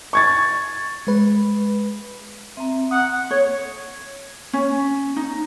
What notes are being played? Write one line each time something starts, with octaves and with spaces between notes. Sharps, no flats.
C#6 G#6 A6
G#3 B4
C4 E5 A#5
F#5 D#6 F#6
C#5
C#4
D#4